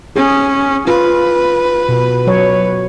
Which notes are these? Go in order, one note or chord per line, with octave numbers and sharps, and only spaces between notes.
C#4 G#4
F4 B4
B2
F#3 C#5